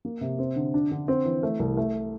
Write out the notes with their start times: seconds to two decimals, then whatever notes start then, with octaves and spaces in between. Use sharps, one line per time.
0.05 A#3
0.21 C3
0.39 C4
0.56 D3
0.74 D4
0.91 D3
1.08 C4
1.25 E3
1.43 A3
1.59 C2
1.77 A3